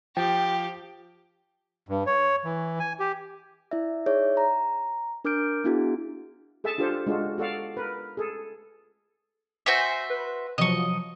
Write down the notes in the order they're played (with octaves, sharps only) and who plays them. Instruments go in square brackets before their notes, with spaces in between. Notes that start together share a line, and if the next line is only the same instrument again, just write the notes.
[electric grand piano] F3 [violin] G4 [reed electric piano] G5
[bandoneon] G2
C#5
E3
G#5
G4
[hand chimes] E4 D5 E5
D#4 G#4 C#5 D5 E5
A#5
D4 A#4 D6 F6 G6 D7
B3 D4 E4 F#4 G#4
[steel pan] G#4 A4 E5 G#5 A5
D4 F4 G4 A4 C5
G#3 D4 F4 F#4
F#4 A4 D5 F5
A#4 B4
G#4 A4
[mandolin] F#4 C5 E5 [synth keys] G#5 G6 A#6
[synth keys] B4
[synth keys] C3 F3 F#3 [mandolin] D#5 C#6